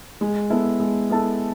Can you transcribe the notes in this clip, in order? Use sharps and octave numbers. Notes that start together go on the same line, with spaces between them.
G#3
B3 E4 A4
G#3
B3 E4 A4